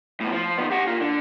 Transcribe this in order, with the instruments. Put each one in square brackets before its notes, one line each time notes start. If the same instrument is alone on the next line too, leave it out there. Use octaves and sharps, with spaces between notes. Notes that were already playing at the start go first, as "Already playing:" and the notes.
[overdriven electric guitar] A2 B3
F3
D#3 B3
G4 F#5
A#2 F4
D3